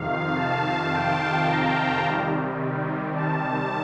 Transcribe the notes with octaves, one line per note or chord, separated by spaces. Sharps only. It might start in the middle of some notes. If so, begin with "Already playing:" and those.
Already playing: F2 C3 D#3 F5
A5
G5
A#5
C3 D#3 G3
A5